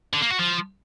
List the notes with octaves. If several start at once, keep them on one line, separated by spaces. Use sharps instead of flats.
D3
A#3
F#4
F3